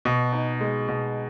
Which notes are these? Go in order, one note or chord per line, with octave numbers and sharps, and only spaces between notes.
B2
D#4
G#3
B2